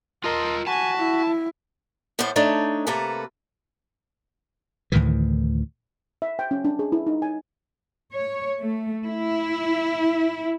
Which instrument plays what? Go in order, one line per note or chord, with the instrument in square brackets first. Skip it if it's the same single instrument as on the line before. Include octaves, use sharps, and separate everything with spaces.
[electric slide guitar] F4 D#5 [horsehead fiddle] A#4 [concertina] A5 C6 D#6
[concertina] F#4 B5 [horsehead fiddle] G#5 [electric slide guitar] A5
[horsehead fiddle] E4
[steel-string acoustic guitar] A2 E3 A3 B3 C5
A3 D4 D#4 C#5
C3 A3 A#3 A4 B4 A#5
[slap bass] D2 A2 D#3 E3
[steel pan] E5
G5
C#4
D4
G#4
E4
D#4
G#5
[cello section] C#5
A3
E4